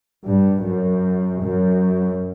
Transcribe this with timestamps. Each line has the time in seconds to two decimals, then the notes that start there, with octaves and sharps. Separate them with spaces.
0.24 G2
0.63 F#2
1.41 F#2